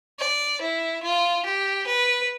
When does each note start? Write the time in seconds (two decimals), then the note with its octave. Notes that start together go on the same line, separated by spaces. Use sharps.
0.19 D5
0.61 E4
1.03 F4
1.45 G4
1.87 B4